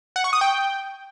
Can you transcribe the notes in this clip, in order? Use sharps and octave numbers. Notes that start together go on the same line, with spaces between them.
F#5
C#6
D#6
G5